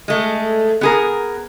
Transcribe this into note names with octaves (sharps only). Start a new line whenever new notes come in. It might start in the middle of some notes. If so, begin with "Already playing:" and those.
G#3 A3
B3 G#4 A#4